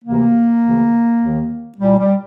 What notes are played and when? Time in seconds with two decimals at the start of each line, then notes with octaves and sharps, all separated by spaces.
0.05 D2 C3 E3 A#3
0.63 D2 C#3 E3
1.21 D#2 D#3
1.78 C2 A#2 G3
1.98 G3